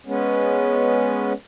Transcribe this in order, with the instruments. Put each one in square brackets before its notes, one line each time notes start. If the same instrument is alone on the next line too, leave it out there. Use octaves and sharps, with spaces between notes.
[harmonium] G#3 B3 C#4